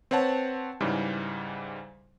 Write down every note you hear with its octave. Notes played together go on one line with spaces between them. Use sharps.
C4 B4 C#5 F#5 A5
G#2 C#3 E3 G3